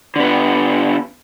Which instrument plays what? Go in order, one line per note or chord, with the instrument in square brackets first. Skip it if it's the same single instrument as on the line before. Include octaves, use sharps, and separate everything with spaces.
[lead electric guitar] D3 B3